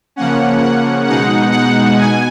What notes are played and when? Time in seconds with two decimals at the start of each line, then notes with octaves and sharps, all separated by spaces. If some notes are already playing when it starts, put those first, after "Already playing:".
0.16 C#3 F3 A#3 C#4 F#5
0.62 F#5
1.07 B2 G#3 D#4 F#5
1.52 F#5
1.97 B2 G#5